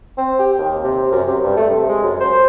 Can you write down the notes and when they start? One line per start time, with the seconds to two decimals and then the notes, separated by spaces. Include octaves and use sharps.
0.18 C4
0.39 G4
0.58 D#2
0.83 C3
1.12 F#2
1.28 C3
1.43 G2
1.57 A3
1.70 C3
1.89 G#3
2.02 F#2
2.20 C5